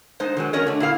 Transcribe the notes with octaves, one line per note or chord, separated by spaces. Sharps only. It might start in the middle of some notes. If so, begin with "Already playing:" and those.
G#3 D#4 C5 D#5
D#3 F#3 G#3
C#4 F#4 A#4 C#5 D#5
D3 A3
A#2 E4 F5